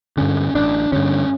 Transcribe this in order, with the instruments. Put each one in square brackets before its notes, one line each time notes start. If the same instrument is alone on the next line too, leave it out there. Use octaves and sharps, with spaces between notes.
[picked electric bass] G2 D3 C#4
A1 D4
G2 D3 C#4